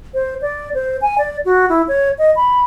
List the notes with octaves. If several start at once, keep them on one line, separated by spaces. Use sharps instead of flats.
C5
D5
C5
G#5
D5
F#4
E4
C#5
D#5
B5